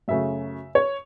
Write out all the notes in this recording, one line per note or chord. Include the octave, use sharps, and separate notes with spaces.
F#2 C#3 A3 E5
C#5